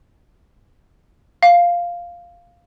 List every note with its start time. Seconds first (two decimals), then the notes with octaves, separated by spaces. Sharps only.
1.43 F5